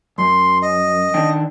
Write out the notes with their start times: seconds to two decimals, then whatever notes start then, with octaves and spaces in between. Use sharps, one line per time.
0.18 F#2 C6
0.62 D#5
1.14 D#3 D4 G5